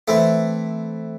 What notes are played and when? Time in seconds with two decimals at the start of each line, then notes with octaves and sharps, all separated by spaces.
0.08 E3 A3 C4